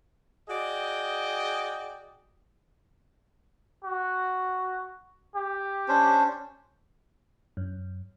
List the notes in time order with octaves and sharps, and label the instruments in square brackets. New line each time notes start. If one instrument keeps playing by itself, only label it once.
[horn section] F#4 G#4 D5 D#5 G5
[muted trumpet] F#4
G4
[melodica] C#4 D4 C5
[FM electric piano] F#2